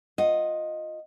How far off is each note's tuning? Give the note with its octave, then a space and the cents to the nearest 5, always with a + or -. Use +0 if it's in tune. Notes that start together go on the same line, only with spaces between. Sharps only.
F4 +15 D#5 +0 F#5 +0